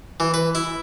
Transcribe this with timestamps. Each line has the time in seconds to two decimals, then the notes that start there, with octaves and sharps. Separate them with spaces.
0.20 E3
0.34 B4
0.55 E4